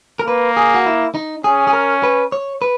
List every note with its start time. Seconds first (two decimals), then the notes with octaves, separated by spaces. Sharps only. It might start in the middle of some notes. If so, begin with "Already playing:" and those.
0.19 A#4
0.27 A#3 B4
0.57 G#4
0.74 F#4
0.86 E4
1.15 D#4
1.44 C#4 G#4
1.67 G#4
1.73 A#4
2.03 B4
2.32 C#5
2.62 B4